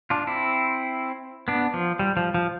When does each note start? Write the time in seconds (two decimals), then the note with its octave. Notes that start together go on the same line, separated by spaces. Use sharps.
0.10 D4 F4
0.27 C4 E4
1.48 B3 D4
1.74 F3
1.99 G3
2.17 F3
2.34 F3